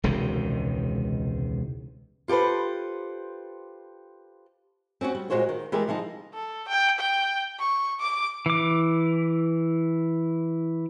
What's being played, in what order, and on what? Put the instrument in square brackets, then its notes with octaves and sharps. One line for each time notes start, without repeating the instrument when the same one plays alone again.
[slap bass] E1 C#2 C3 D#3
[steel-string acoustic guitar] F4 G4 A4 B4 C5
[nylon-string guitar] C4 C#4 F4 F#4
G3
A#2 C#3 G#3 F#4 C5 C#5
D#3
E3 G#3 G4 A#4 D5
E3 F3 G3 D#4
[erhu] A4
G5
G5
C#6
D6
[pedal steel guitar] E3 D6